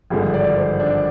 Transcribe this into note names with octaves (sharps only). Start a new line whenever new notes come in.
G#1 G2 D3 F3 G#4
D5
C5
D4